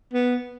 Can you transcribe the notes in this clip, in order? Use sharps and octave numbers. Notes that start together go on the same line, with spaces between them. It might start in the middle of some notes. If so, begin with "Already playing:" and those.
B3